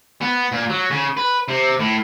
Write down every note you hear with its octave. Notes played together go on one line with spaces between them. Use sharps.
B3
A#2
F#3
C#3
B4
C3
A2